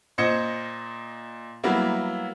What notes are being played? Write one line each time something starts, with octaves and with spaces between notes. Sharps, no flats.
A#2 C5 D#5 G#6 C#7
F#3 G3 A#3 B3 E4